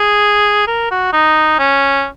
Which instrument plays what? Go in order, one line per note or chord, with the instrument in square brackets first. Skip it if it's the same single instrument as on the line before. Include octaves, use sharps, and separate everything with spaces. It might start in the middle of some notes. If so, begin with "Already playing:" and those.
Already playing: [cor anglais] G#4
A#4
F#4
D#4
C#4